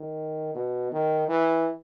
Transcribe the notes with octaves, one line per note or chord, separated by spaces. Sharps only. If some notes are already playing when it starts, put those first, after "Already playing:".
Already playing: D#3
B2
D#3
E3